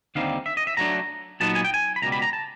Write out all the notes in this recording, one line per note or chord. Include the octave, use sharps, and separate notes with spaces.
D#2 D3 G3 C4 D#4 F5
E5
D#5
E5
A2 F#3 A3 D4 A#5
A#2 F#3 B3 D#4 A5
G#5
G5
G#5
B5
C#2 B2 G3 A#5
B5
A#5
A5